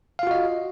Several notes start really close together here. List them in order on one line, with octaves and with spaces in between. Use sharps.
F5 F4 F#4 D#5